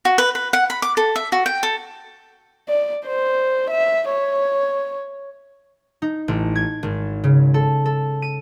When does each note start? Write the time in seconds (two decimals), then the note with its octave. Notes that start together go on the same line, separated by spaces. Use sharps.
0.05 F#4
0.18 B4
0.35 B4
0.53 F#5
0.70 B5
0.82 D6
0.97 A4
1.16 E5
1.32 F#4
1.46 G5
1.63 A4
2.69 D5
3.07 C5
3.71 E5
4.09 C#5
6.02 D#4
6.28 A1
6.55 G#6
6.83 G#1
7.24 C#3
7.54 A4
7.85 A4
8.22 D#7